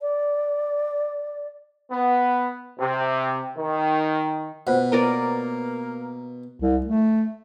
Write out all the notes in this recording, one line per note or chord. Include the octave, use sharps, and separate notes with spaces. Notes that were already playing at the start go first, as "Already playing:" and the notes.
D5
B3
C3
D#3
B2 F4 C5 F#5
A#3 B3 A#4 D5
C2
A3